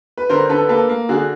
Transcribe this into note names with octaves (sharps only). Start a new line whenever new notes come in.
B4
D3 A#4 C5
D3 A4 B4
A#3 A4 B4
A#3
D3 F#4 G#4